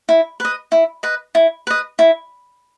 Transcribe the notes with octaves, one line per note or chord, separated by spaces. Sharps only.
E4
B4 D#5
E4
B4 D#5
E4
B4 D#5
E4